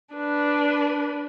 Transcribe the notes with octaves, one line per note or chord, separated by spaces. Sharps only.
D4 B4